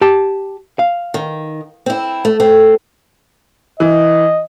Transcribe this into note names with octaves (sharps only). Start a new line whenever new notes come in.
G4 A5
F5
D#3
C4 E4
A3
A3 C4
E3 D#5